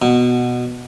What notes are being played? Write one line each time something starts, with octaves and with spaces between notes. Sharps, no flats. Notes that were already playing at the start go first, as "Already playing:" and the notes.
B2